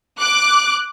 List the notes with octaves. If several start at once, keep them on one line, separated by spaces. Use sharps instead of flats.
D6 F#6